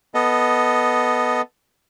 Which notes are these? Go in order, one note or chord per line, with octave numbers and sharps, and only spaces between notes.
B3 A4 D#5